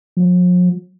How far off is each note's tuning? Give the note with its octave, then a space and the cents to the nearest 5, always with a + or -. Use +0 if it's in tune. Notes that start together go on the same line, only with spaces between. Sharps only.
F3 +45